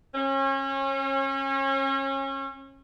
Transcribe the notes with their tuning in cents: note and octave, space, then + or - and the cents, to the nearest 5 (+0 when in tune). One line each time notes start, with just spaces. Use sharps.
C#4 -30